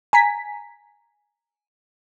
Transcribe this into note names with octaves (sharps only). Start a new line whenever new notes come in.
G#5 A#5 B6